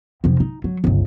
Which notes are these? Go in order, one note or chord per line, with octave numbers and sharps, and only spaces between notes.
F1 F2
D#4
F#3
G1 C#2